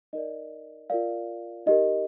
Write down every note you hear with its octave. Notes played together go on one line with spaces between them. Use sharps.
D#4 A#4 D5 D#5
F4 A#4 D5 F5
D#4 G4 A#4 D#5